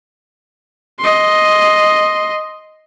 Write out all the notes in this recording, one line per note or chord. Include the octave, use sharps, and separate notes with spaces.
D#5 C6